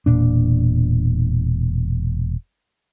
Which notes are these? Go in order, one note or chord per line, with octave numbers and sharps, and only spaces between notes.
E1 A#2 D4